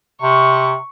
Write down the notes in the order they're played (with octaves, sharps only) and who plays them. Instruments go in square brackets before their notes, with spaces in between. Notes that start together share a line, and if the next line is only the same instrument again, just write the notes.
[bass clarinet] C3 [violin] C#6